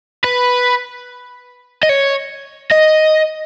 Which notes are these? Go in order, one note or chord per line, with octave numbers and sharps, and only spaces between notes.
B4
D#5
C#5
D#5